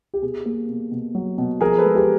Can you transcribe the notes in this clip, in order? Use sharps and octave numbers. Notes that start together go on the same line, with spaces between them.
G4
B2 G#4
A#3
B2
B2
F#3
B2
F3 G#4 A#4
A4 B4
G#3
G4 A4